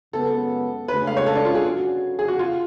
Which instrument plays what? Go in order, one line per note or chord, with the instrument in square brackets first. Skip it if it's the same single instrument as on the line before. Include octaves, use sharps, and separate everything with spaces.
[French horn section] F#2 C#3 G#3 B3 [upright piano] A4
[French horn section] D2 C#3 G#3 [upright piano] B4
[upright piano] F5
C#5
A4
D4
F4
G#4
[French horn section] D3 F#3 C#4 F#4
[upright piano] G#4
F#4
F4